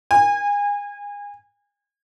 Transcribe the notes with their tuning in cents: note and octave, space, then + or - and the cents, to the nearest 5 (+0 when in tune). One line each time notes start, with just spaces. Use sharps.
G#5 -30